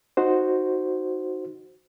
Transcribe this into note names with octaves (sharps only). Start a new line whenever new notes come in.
D#4 F#4 C5